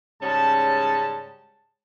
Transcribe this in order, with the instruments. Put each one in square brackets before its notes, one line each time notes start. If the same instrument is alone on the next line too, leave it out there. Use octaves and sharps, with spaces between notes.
[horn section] G#2 C#3 G3 C#4 A5